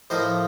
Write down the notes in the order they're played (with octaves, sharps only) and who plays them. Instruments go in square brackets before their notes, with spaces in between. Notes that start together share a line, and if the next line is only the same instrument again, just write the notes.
[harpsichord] A2 F3 A#3 C5 D#5